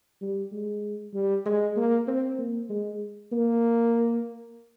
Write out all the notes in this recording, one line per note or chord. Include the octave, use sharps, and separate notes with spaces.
G3
G#3
G3
G#3
A#3
C4
A#3
G#3
A#3